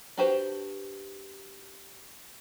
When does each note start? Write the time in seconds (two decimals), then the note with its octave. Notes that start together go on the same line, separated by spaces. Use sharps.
0.17 D4 F#4 G4 B4 C5